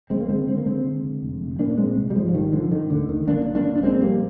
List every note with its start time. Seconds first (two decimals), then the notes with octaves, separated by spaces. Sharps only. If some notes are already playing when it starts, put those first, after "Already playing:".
0.10 G1 G#3 C4
0.20 A#3
0.29 D3 G#3 C4
0.48 D3 C4
0.57 A#3
0.66 D3 G#3 C4
0.85 D3
1.04 D3
1.22 F1
1.41 F1
1.59 A#2 A#3 D4
1.70 D4
1.78 A#2 G#3 C4
1.97 C2
2.10 G3
2.15 G#2 F3 G#3
2.28 F3
2.33 G#1 D#3 G3
2.52 G#2 D3 F3
2.71 D3 D#3
2.89 D2 D3
3.08 D2 D#3
3.27 G1 A#3 D4
3.46 G2
3.55 A#3 D4
3.64 G1
3.75 D4
3.83 A#1 G#3 C4
4.01 A#1 G3 A#3